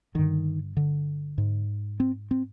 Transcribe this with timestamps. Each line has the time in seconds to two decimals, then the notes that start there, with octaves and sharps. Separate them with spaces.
0.15 G2 D3 D#3
0.77 D3
1.38 G#2
2.00 C4
2.31 C4